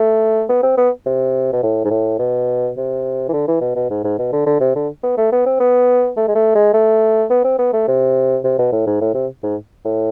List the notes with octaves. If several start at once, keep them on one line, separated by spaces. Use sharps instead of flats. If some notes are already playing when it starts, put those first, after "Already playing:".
Already playing: A3
B3
C4
B3
C3
B2
A2
G#2
A2
B2
C3
E3
D3
E3
B2
B2
G#2
G#2
B2
D3
D3
C3
D3
B3
A3
B3
C4
B3
A3
G#3
A3
G#3
A3
B3
C4
B3
A3
C3
C3
B2
A2
G#2
A2
C3
G#2
A2